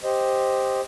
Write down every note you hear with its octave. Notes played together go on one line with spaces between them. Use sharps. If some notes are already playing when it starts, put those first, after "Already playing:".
G4 C5 D#5